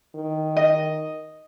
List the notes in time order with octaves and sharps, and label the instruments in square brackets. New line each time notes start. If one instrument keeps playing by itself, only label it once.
[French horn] D#3
[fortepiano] D#5